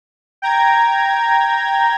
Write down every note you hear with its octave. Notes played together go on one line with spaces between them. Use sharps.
G5 A#5 G#6